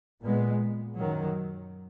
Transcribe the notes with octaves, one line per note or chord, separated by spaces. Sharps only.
A#2 G#3 B3
F#2 D#3 F#3